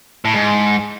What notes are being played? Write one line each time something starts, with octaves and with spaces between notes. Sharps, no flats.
A2
G#2